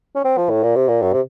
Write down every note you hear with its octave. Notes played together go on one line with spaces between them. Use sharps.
C#4
C4
F3
A2
A#2
C3
A#2
F#2
C3